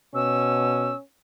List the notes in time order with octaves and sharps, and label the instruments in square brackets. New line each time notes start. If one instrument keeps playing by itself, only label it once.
[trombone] B2 [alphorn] C#4 [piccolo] E6